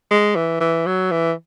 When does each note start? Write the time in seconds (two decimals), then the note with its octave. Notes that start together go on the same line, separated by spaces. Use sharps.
0.11 G#3
0.36 E3
0.60 E3
0.86 F#3
1.11 E3